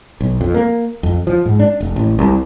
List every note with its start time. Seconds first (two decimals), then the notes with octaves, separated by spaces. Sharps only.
0.21 B1
0.41 F2
0.54 A#3
1.03 F2
1.27 F3
1.46 G#2
1.59 D4
1.81 F1
1.96 A1
2.19 C2